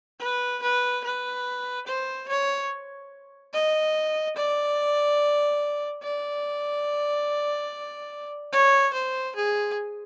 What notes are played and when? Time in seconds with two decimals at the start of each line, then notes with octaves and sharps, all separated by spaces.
0.20 B4
0.62 B4
1.04 B4
1.87 C5
2.28 C#5
3.53 D#5
4.36 D5
6.02 D5
8.52 C#5
8.93 C5
9.36 G#4